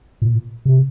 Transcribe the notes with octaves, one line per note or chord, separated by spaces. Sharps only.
A#2
C3